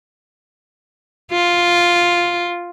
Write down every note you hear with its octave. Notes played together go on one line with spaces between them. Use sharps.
F4